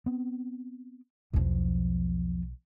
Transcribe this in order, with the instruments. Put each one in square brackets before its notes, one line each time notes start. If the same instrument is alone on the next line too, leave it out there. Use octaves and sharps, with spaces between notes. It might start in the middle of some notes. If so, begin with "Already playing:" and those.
[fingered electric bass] B3 C4
[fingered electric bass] B1 [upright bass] E2 F3